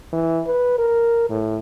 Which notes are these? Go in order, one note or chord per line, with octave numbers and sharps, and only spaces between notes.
E3
B4
A#4
A2